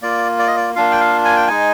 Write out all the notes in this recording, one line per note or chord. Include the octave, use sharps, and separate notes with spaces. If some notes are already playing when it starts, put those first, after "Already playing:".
A#3 F4 D5
D5
D#5
D5
A#3 D4 F4 F5
G5
F5
G#5
G5
G#3 D#4 G#5